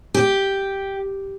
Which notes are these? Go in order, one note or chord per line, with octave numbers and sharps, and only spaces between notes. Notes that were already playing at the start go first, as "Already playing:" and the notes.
G4